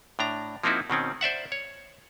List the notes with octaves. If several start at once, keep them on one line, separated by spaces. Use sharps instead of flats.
A2 D4 A#5
F3 A#3 C4 D#4 E4 F#4
B2 D#3 C4 C#4
C5 D5 E5 F#5
C#5